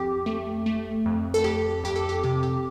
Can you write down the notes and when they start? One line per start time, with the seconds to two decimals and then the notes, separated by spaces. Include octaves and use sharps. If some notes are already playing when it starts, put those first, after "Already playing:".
Already playing: F2 G4
0.26 A3
0.66 A3
1.06 F2
1.34 A4
1.44 F2 G4
1.84 F2 G4
1.96 A4
2.09 G4
2.23 C3 G4
2.43 G4